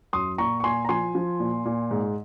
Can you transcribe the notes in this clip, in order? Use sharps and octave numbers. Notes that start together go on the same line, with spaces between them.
F#2 C6 D#6
A#2 A#5 C#6
C#6
A#2 G#5 C6
A#5
F3 G#5 C6
F3
A#2
A#2
G#2